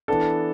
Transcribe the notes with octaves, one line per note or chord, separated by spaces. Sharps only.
E3 B3 D4 A4